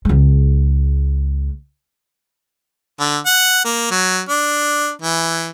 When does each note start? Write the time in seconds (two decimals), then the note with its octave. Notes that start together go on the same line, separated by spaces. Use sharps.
0.05 C#2 G#3
3.00 D3
3.26 F#5
3.65 A#3
3.91 F#3
4.29 D4
5.02 E3